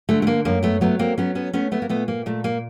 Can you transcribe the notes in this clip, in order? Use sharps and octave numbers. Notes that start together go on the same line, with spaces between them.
D3 A3
A3
A#3
F#2 A#3
A3 B3
F#3 A3 B3
A#3 C4
F#3 B3 C#4
B3 C#4
A3 B3 C#4
A3 B3
A#3
A#2 A3 B3
A#3
A#2 A3
A#3